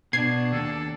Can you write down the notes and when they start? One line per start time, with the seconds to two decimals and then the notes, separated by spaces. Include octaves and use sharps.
0.13 B2 D4 G#6 C7
0.52 D#2 A4